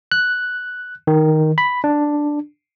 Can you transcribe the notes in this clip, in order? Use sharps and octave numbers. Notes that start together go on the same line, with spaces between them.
F#6
D#3
B5
D4